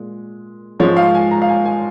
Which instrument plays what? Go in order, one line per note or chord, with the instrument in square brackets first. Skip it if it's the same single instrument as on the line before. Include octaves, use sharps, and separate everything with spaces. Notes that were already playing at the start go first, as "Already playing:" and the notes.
Already playing: [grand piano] A#2 G#3
G#2 F3 G#3 C#5
F5
G#5
A#5
F5
G#5
G#5